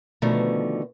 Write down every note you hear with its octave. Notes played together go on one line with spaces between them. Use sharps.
B2 D3 D#3 F3 A3